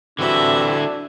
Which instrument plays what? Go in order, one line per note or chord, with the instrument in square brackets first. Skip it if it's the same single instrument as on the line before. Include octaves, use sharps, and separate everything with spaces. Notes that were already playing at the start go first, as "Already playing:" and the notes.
[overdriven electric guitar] D3 E4 [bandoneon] E3 G3 C4 [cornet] D4 [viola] F#4 E5